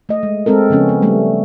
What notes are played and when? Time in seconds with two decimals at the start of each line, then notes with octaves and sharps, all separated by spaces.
0.09 A3 D#5
0.23 G#3
0.46 G#3 C4 A4 A#4
0.70 C#3 F3 B3 C#4
0.89 B3
1.02 G3 A3 B3